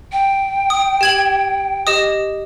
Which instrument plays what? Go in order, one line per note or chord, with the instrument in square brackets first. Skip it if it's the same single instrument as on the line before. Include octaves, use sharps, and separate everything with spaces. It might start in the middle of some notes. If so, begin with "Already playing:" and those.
[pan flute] G5
[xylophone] D#6
G4 G#6 F#7
G4 D#5 D#6